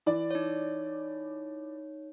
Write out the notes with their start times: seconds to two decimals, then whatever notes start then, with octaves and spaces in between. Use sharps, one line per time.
0.06 E3 D5
0.31 D#4 C#5